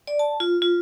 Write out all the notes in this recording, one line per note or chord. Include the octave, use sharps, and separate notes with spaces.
D5
A5
F4
F4